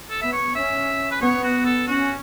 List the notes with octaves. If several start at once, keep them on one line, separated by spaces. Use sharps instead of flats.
A4
B3 E5
C#5
C#4 E5
B4
B3 C#5
F#4
A4
C#4 F#4